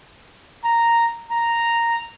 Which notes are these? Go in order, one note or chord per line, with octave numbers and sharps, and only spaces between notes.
A#5
A#5